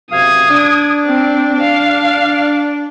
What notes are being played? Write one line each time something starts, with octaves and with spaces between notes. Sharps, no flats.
F#2 C3 F5 D#6 G#6
D4
C4
F5